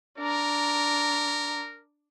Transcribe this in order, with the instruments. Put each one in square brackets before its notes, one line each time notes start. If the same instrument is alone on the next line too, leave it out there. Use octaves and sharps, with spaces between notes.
[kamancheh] D4 A#5 [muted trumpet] A#4